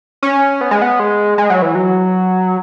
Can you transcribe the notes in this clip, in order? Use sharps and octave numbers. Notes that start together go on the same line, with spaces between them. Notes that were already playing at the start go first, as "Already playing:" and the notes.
C#4
B3
G#3
B3
G#3
G#3
F#3
E3
F#3